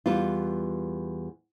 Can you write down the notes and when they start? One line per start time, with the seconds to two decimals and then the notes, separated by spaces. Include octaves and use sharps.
0.06 E2 G3 B3 F4